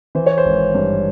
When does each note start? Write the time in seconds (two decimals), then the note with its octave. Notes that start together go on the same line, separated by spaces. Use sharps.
0.15 E3 C5
0.26 C#5
0.38 C5
0.45 G#1
0.75 G2